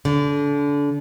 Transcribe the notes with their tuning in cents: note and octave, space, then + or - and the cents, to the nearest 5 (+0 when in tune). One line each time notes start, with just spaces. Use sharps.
D3 -30